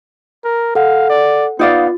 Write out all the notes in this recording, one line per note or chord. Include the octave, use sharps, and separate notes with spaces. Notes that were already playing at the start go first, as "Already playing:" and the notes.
A#4
A4 F5 F#5
D5
B3 D#4 F4 D5 F5